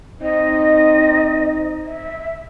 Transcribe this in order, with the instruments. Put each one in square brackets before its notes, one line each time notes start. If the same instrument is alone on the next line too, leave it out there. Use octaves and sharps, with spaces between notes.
[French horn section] C4 D#4 [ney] D#5
[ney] E5